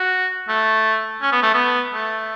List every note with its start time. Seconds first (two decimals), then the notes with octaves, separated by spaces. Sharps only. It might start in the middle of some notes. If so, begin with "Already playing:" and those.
Already playing: F#4
0.49 A3
1.22 C#4
1.32 B3
1.43 A3
1.54 B3
1.94 A3